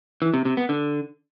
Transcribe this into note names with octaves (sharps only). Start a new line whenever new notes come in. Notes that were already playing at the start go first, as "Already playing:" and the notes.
E3
C3
C3
B3
D3